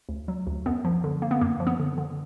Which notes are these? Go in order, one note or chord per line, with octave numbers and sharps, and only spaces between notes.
D2
F#3
D2
F#2 B3
F3
D3
A#3
B3
F#2 A#3
F3
B3
D3
D3